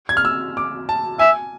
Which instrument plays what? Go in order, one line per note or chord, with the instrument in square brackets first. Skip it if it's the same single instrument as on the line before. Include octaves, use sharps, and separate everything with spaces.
[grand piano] G#6
F6
E6
D6
A5
[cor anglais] E5 [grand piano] G#5